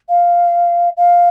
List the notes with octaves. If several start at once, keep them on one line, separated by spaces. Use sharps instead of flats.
F5
F5